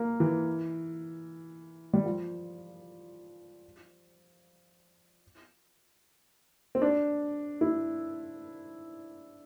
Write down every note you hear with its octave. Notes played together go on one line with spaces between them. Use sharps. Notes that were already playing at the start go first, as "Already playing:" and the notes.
Already playing: A#3
E3
G3
F3
C4
D4
E4